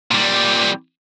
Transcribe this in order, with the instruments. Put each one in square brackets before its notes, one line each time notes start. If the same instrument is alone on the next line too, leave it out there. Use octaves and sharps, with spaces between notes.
[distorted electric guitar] A#2 G3